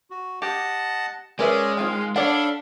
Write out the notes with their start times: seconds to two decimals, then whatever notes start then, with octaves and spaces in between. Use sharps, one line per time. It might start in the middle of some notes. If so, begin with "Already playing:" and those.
0.10 F#4
0.42 G4 D#5 F#5 A5
1.39 G#3 C#4 A#4 B4 D5 E5 G#5
1.77 D#3 C4 F4 F5
2.16 D4 A4 C#5 D5 F5 F#5 B5